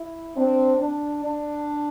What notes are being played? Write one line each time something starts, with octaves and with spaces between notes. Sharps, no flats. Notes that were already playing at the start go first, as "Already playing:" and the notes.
Already playing: E4
C4 D4
D4
D4